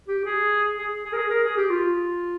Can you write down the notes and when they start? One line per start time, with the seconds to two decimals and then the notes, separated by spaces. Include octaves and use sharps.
0.08 G4
0.25 G#4
0.78 G#4
1.05 G#4
1.13 A#4
1.17 G#4
1.30 A#4
1.44 G#4
1.57 G4
1.70 F4